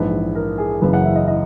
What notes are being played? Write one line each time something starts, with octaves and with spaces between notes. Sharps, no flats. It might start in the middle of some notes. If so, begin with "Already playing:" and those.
Already playing: A#1 G#2 E3 B4
A#4
G#4
F#1 F#2 C#3 E3 B4
F#5
E5
D#5
D#5